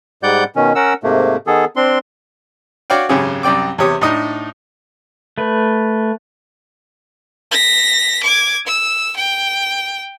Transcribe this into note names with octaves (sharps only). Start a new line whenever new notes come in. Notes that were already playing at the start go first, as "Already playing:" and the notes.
G#2 G3 D5 F#5 G6
B2 D#3 C#4
C#4 A#4 F#5 E6
G#2 C3 A3 A#3
D#3 B3 G#4 A4
C4 D4 C6
F#4 C#5 D5 F5 G5
G#1 F#2 C#3 G4 G#4 C#5
C2 F#2 D5 G5 D6
E2 C3 G4 C#5 D#6
A2 D4 D#4 D#5 D#6
A3 B4
A#6 B6
D6 G#6
E6
G5